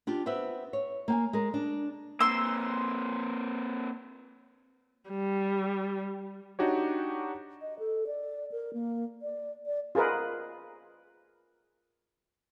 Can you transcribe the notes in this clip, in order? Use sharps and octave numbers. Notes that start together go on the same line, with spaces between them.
D4 F4 G4
B3 C4 B4 E5
C#5
A#3 G5 G#5
G#3 A#4
D4
A#3 C4 C6 E6
G3
D4 D#4 F#4 G4 C#5
D#5
A4
D5
A#4
A#3
D5
D5
F4 G#4 A#4 B4 D#5